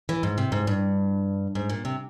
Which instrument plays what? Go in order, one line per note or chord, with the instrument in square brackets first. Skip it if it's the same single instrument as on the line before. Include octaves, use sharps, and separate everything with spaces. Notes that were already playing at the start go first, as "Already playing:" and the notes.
[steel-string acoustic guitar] E3
G#2
C3
G#2
G2
G#2
A#2
C3